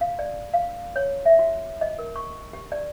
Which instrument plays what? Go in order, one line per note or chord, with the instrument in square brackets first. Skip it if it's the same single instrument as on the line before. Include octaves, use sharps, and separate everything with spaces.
[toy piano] F5
D5
F5
C#5
E5
F#4
D#5
A#4
C#6
G4
D5